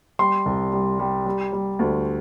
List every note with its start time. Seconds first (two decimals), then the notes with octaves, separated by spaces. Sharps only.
0.19 G3 C6
0.46 C2
0.73 G3
0.99 G3
1.26 G3
1.53 G3
1.79 D2